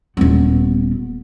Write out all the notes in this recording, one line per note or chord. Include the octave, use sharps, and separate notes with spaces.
D#1 B3